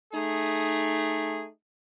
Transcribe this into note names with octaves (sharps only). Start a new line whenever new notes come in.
A3 D#4 G#4